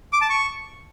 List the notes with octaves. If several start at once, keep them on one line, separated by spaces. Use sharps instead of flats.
D6
A5
C#6